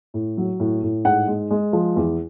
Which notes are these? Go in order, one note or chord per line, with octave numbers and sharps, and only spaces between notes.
A2
F#3
A2
A2
G#2 F#5
G#3
G#3
F3
E2